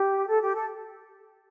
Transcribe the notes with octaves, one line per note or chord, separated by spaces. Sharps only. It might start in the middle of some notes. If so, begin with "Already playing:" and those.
Already playing: G4
A4
G4
A4